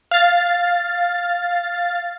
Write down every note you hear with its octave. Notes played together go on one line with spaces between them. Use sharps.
F5 A6